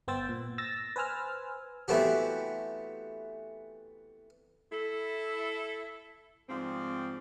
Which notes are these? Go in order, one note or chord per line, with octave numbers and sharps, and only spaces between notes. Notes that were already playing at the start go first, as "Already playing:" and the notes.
G1 B3 C5 G5 E6 A6
A#2
E6 A6 A#6
B4 C5 G#5 E6 F6
E3 A3 B3 C4 F#4 G4
E4 A4
G#2 F3 G3 C4